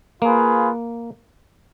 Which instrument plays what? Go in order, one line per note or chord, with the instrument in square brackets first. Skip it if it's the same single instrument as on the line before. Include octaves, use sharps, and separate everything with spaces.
[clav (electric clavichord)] A#3 [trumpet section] F4 G#4 B4